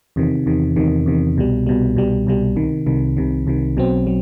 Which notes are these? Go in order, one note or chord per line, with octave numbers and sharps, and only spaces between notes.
E2 C3 D#3
E2 C3 D#3
E2 C3 D#3
E2 C3 D#3
C2 B2 G3
C2 B2 G3
C2 B2 G3
C2 B2 G3
C2 C3 D#3
C2 C3 D#3
C2 C3 D#3
C2 C3 D#3
B1 B2 F#3 C4
F#3